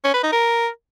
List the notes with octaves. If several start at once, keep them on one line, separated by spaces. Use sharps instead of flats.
C#4
B4
D#4
A#4